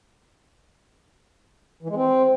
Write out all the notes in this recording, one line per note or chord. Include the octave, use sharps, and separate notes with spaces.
E3
G#3
C4